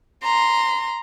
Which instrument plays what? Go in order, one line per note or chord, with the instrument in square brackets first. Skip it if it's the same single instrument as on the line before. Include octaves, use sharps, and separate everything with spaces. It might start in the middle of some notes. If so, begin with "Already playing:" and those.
[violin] A#5 C6